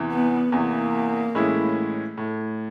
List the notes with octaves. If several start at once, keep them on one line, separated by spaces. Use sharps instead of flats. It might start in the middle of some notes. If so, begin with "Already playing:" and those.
Already playing: E2 C3 E3
B3
E2 C3 E3 A#3
A2 E3 G#3 C#4 E4
A2